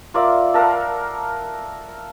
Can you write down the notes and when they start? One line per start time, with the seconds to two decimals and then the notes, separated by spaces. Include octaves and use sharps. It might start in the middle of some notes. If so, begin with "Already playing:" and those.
0.14 F4 A#4 D5 E5
0.54 A4 A#4 F5 F#5